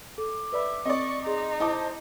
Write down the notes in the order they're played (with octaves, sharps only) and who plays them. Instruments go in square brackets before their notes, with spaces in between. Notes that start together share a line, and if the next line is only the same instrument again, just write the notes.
[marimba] A4 [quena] D6
[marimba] B4 D5 B5 [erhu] E5
[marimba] C4 [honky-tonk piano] D5 D#5 [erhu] C#6
[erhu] D#4 [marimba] G#4 [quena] C6
[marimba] E4 [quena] C5 [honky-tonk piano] D#5 A5 D6